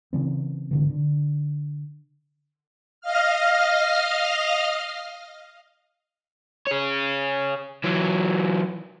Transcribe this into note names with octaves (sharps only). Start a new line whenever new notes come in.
C#3 E3 C4
G#1 D3 E3
D3
D#5 F5 F6
G#4 C#5
E3 F#3